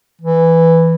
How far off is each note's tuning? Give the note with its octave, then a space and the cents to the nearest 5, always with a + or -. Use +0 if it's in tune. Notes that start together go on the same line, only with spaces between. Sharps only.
E3 +0